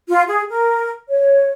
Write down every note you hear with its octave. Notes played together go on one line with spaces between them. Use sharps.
F4
G#4
A#4
C#5